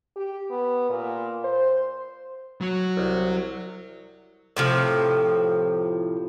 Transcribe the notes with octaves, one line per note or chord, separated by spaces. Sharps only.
G4
B3
A#2
C5
F#3 F#4
C2
A2 C3 F3